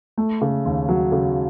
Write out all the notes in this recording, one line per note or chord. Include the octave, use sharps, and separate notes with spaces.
A3
C#3
D#2
F#3
C#3